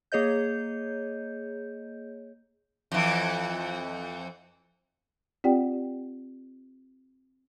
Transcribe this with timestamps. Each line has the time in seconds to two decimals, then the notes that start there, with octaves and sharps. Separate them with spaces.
0.12 A#3 G#4 C#5 D#5 G6
2.92 F2 E3
5.44 C4 F4 G4 D5 F#5 G5